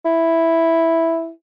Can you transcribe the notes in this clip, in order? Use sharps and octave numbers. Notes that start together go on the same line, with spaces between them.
E4